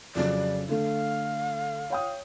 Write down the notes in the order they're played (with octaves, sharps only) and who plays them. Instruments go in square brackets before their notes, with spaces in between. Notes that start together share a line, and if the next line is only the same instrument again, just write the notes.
[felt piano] F2 C#3 F#3 [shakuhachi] D5
[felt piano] D3 A3 [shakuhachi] F5
[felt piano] C#5 G5 D#6